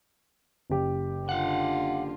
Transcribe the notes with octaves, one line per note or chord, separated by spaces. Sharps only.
F#1 G4
D3 F4 F5 F#5